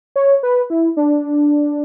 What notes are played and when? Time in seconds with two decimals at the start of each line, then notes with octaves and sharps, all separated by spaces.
0.16 C#5
0.43 B4
0.70 E4
0.97 D4